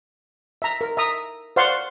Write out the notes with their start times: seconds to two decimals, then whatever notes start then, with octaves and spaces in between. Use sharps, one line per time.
0.62 E5 A#5
0.81 A#4
0.97 E5 A#5 D#6
1.56 C5 D5 F5 F#5 C6 C#6